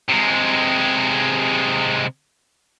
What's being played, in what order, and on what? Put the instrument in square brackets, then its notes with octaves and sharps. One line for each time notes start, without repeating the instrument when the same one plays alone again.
[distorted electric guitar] C3 G#3